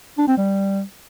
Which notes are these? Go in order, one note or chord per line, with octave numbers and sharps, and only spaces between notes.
D4
C4
G3